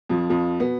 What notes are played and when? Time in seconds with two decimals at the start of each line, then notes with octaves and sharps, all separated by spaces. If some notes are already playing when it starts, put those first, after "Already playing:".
0.09 F2 F3
0.30 F2 F3
0.60 B2 B3